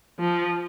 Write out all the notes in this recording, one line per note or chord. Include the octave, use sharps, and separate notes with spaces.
F3